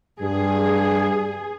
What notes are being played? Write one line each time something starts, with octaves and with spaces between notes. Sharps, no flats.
G2 G#4